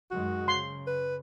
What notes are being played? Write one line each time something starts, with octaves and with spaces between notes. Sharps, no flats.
F#2 D#3 G#3 F#4
C#3 C6
B4